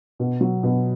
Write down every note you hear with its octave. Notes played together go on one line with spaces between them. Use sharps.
B2
F#3
B2